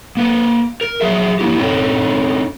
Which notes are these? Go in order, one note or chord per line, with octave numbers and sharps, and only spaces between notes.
A#3 B4
A#4
F#3 G#4 E5
A#3 E4 G4
C4 C#4 D#4 A4